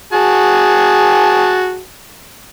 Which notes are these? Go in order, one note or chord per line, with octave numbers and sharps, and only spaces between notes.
F#4 G#4 A5